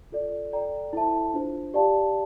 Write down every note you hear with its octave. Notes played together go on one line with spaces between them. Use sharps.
F4 A4 D5
A4 D5 G5 A#5
E4 A4 C5 E5 A5
D4 F4 C5
G4 D5 F5 A5